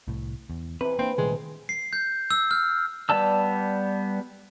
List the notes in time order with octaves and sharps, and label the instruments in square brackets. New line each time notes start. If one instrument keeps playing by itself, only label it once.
[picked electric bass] C2 A2
E2
[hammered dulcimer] C3 E3 [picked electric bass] C4 [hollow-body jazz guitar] B4
[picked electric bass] A#3 D4 [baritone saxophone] C4
[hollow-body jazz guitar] C2 [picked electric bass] A#2 D#3 A3 [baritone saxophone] G#3
[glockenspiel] C7
G6
E6
F6
[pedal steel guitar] G3 B3 D5 A5 E6